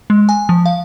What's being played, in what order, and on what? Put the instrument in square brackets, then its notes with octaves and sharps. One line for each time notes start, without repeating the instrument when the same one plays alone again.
[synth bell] G#3
G#5
F3
F5